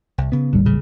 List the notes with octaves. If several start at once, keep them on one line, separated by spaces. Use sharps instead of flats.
C2
C#3 B3
D#1 A1 D3 G3
C#3